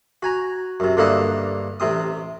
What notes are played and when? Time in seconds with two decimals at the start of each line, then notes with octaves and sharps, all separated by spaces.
0.23 F#4 G#5 A#5
0.80 F#2 C3
0.97 G2 D3 A#3 E4 D#5 F#5
1.80 A1 C3 C4 D#6